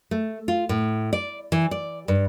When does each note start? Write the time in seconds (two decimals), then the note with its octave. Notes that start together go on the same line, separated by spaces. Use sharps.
0.11 A3
0.48 F4
0.69 A2
1.13 D5
1.52 E3
1.71 D5
2.08 G2